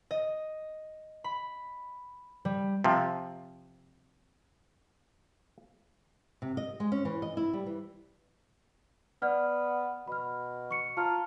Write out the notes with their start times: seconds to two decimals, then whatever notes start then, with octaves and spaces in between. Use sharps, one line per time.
0.11 D#5
1.24 B5
2.45 G3
2.84 C3 F3
6.42 C3
6.57 D#5
6.80 G#3
6.92 C#4
7.05 E3
7.22 D#5
7.37 E4
7.53 G3
7.66 E3
9.22 B3 D5 F#5 F6
10.07 B2 B5 F6
10.71 C#6 C#7
10.97 F4 A5 A#5 F6